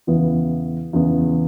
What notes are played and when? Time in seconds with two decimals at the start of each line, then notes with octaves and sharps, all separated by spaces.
0.07 E2 C#3 E3 B3
0.93 E2 C#3 E3 B3